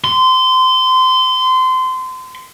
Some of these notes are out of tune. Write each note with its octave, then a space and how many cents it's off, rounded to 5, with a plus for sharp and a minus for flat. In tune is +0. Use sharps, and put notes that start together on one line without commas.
C6 -25